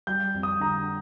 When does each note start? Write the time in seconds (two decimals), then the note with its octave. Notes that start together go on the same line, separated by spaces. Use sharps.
0.07 G3 G6
0.34 F2
0.43 D#6
0.60 D3 A#5